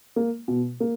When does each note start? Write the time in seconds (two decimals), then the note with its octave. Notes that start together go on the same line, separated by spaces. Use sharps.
0.16 A#3
0.48 B2
0.80 A#3